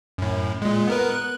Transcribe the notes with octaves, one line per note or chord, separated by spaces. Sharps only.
F#2 A2
A#2 G#3
B3 A#4 B4
F#6